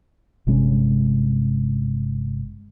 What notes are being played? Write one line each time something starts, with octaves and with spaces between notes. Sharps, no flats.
G1 C3 G#3 C#4